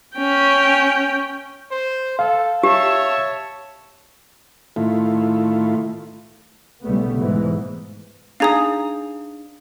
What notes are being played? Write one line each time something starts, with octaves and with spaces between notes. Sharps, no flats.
C#4 G5
C5
A4 F5
G4 C#5 E5 A5
A2 D#3 A3 E4 F4
B1 C#3 G3 A3 B3
G#2 E3
D4 D#4 G#4 F5 A#5 D#6